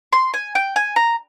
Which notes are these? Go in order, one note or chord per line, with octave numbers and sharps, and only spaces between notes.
C6
G#5
G5
G#5
A#5